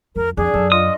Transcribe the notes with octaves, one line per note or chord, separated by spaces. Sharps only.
F2 A#4
F2 D4 G#4
F#2 A4
F4 D#5 D#6